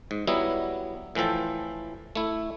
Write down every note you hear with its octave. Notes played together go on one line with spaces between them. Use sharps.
G#2
F#3 G3 B3 E4
A2 E3 F3 A4 G5
A3 E4